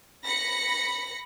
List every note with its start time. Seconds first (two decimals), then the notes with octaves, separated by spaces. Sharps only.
0.25 B5 A#6 C#7